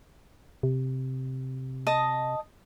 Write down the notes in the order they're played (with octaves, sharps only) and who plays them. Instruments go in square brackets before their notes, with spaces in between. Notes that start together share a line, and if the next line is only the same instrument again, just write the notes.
[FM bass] C3
[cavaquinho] D#5 A5 D#6